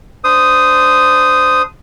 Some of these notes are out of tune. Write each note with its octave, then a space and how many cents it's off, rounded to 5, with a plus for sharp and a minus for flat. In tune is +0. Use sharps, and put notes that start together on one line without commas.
D4 -5 C5 -20 D#6 +0